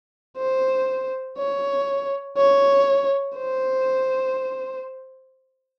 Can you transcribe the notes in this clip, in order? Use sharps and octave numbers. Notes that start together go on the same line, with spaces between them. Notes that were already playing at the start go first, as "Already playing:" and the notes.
C5
C#5
C#5
C5